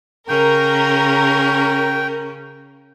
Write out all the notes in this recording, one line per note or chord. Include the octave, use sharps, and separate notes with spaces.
C#3 C#4 A#4 G5